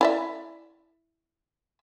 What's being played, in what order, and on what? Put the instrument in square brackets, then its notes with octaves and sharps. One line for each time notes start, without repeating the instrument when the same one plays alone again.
[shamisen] E4 D5 E5